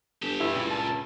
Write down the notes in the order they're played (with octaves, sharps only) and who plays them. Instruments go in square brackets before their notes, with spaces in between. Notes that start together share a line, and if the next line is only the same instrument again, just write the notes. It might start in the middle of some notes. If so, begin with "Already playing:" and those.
[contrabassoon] G1 [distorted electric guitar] G4 A4
[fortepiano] G2 E3 E4
[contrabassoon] C#2 [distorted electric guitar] A#2
[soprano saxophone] A5